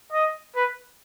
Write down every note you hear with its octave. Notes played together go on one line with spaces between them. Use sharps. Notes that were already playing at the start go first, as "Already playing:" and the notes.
D#5
B4